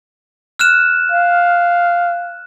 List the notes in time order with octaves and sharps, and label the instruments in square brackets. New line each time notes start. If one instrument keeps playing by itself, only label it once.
[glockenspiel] F6 F#6 E7
[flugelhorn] F5